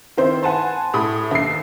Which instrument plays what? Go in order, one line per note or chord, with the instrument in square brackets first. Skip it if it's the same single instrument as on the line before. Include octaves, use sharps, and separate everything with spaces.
[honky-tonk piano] D#3 C4 E4 C5
B4 F#5 G#5 A5 C6
A2 B5 D#6
D#2 E5 C7